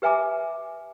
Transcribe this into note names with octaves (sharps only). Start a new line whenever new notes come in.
G4 B4 E5 G#5 A#5 D6